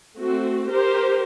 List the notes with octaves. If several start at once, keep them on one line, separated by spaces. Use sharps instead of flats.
A3 C4 F#4
G4 A#4 C5